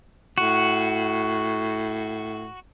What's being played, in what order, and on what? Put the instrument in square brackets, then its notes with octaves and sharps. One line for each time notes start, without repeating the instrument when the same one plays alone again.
[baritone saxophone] A2 [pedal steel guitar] F#4